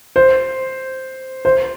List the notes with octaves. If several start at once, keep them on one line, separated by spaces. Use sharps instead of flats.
C5
C5